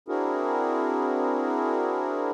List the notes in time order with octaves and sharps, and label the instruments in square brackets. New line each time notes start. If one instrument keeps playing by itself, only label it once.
[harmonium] C4 D4 E4 F#4 G#4 A#4